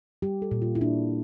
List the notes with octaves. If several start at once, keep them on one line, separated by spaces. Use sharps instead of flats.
G3 G4
A4
A#2
F4
E4
A#3 D4